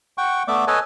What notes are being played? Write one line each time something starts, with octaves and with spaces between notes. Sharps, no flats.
F#5 G5 C#6
A3 B3 D5 E5 D6
A4 B4 C#5 D#5 G#5 A5